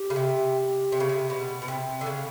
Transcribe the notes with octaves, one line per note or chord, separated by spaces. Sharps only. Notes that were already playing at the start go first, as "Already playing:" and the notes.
Already playing: G4
C#3
C3
C3
C#3
C3
B2
B2
C3
D3
C#3